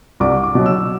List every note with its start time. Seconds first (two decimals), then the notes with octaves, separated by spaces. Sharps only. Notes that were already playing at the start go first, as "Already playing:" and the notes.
0.20 C2 D6
0.43 D6
0.55 B2 F#3
0.66 E6